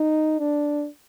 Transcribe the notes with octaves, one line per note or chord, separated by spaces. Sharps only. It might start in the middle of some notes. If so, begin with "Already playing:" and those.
Already playing: D#4
D4